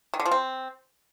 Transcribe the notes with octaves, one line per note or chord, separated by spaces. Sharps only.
D#3
D3
F3
C4